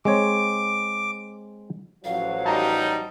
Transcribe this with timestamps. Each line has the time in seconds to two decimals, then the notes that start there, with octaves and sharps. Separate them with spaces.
0.05 G#3 C4 C#5 D6
2.05 A1 F3 F#3 F5
2.46 G3 D#4 A5 A#5